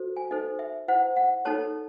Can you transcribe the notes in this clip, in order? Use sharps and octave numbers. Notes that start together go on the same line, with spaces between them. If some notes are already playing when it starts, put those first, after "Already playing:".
Already playing: F#4 A4 C5
G#5
D#4 A4 C5 D#5
E5
E4 C5 F#5
F#5
D#4 A4 C#5 A5